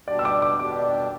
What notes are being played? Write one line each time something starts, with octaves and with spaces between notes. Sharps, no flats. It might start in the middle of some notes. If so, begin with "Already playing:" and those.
B2 G3 D4 G4 D5
E6
D6
D6
B2 G3 D4 G4 D6